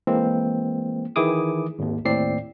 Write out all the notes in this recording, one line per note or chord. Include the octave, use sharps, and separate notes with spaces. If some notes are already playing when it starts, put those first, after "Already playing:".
E3 G#3 A#3 C4
D#3 E3 E4 G#4 D6 D#6
G#1 D#2
D#2 A2 C4 D5 C7